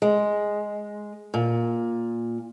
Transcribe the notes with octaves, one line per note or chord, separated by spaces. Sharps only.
G#3
A#2